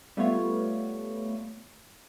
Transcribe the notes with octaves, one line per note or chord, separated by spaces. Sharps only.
G3 A3 B3 F4 C#5